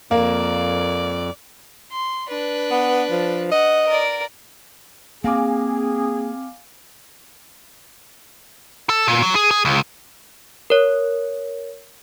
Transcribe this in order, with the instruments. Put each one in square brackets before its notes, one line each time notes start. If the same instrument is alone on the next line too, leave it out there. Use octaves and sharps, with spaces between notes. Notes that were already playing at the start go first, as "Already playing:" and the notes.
[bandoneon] F2 [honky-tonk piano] A#3 [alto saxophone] D5
[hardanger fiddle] C6
D4 B4
[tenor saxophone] B3
F3
[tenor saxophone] D#5 [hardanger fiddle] F#5
[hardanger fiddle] A#4 D5
[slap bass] A#3 [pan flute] C4 [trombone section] G#4 [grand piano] F5 G#5 D6
[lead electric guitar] A4
A#2
F#3
G#4
G#4
C#2
[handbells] A#4 C#5